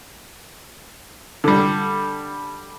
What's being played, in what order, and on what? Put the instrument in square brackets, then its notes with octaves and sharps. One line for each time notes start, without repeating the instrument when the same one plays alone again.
[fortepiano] D3 G3